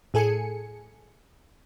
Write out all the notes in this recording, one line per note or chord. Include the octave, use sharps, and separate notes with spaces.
A2 G#4 A4 G#5 C#7